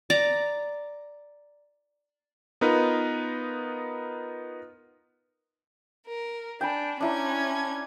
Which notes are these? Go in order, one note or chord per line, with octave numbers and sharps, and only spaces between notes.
D5 A#5
B3 D#4 F4 A#4 B4
A#4
D4 G5 G#5 B5
C#4 D4 E4 A#5 G#6